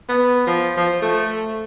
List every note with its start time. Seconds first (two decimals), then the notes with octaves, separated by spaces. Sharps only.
0.09 B3
0.47 F3
0.77 F3
1.02 A3